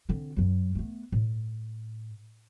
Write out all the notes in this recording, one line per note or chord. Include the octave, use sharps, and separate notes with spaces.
D3 C4
F#2 F#3
A3 B3
A2